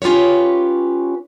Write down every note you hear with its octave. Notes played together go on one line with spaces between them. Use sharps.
C#4 F4 G4 B4 C#5